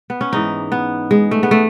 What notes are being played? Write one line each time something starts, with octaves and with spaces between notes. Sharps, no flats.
B3
C#4
G#2 E3 D#4
B3
G#3
A3
B3
A3